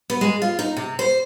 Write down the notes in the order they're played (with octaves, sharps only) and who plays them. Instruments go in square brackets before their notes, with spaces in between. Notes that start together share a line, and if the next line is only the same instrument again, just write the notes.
[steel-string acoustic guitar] B3
G#3
F4
D#4
C3
C5